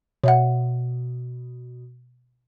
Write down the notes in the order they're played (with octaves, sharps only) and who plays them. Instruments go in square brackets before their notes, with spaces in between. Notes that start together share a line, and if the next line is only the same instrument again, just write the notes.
[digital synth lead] B2 [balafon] C#5 E5 F#5